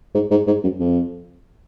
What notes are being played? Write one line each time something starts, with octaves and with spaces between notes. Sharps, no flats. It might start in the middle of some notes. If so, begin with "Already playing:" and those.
G#2
G#2
G#2
F#2
F2